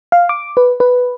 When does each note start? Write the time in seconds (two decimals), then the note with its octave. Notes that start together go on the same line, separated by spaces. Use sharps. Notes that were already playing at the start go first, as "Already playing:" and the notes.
0.12 F5
0.29 D6
0.57 B4
0.80 B4